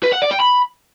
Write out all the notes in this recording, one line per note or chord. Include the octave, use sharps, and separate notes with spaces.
B4
F#5
D5
G5
B5